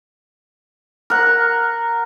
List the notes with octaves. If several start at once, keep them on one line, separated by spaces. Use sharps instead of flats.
A#4 F#5